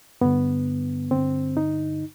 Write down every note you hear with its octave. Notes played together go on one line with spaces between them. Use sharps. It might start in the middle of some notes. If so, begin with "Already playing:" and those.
G2 D3 B3
G2 D3 C4
D#4